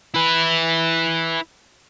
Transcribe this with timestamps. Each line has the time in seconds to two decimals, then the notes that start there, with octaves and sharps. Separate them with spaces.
0.14 E4 B4